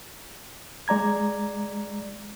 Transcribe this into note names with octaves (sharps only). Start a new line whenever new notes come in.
G#3 D5 A#5 G#6